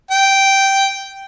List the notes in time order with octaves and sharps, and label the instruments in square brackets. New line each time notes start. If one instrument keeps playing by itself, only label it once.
[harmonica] G5